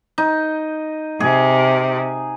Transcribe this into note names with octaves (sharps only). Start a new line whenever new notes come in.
D#4
C3 G#4